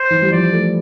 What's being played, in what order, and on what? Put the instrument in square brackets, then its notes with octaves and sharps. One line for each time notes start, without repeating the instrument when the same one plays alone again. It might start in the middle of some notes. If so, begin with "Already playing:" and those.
Already playing: [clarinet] C5
[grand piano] E3
G3
[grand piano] F3 [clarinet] D5
[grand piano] A3